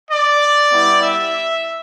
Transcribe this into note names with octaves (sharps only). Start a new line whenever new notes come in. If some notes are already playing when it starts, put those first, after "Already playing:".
D5
G3 B3 E4 G4
E5